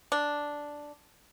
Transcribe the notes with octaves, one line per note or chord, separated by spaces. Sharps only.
D4